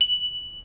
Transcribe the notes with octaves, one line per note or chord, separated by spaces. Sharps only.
F#7